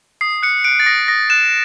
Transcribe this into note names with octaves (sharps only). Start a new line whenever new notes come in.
D#6 C7
F#6 C#7
F#6 D7
A6
D#6 A#6
D#6 A#6
F#6 E7